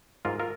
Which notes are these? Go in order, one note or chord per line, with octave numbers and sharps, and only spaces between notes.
G#2 F4 A#4
F4 A#4